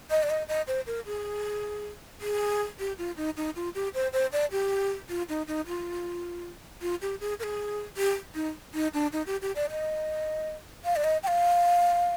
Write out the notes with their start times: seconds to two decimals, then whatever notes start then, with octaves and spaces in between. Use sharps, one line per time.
0.11 D#5
0.23 D5
0.30 D#5
0.48 D#5
0.67 C5
0.87 A#4
1.06 G#4
2.21 G#4
2.79 G4
2.98 F4
3.17 D#4
3.37 D#4
3.56 F4
3.75 G4
3.94 C5
4.13 C5
4.32 D5
4.51 G4
5.09 F4
5.29 D#4
5.48 D#4
5.67 F4
6.82 F4
7.02 G4
7.21 G#4
7.39 A#4
7.43 G#4
7.97 G4
8.35 D#4
8.74 D#4
8.94 D4
9.12 D#4
9.26 G4
9.42 G4
9.56 D5
9.71 D#5
10.85 F5
10.96 D5
11.04 D#5
11.23 G5
11.27 F5